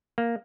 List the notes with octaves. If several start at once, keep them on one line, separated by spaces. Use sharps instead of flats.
A#3